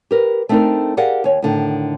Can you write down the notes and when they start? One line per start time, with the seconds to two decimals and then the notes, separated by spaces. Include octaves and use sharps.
0.11 G4 A#4 B4
0.49 A3 C4 D4 D#4 A4 A#4
0.97 G4 G#4 A#4 D5 F5 F#5
1.24 D#2 C#5
1.42 A2 D3 D#3